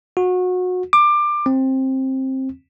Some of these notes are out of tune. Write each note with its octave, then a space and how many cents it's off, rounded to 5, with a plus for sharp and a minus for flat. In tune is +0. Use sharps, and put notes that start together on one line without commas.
F#4 -25
D6 +20
C4 +15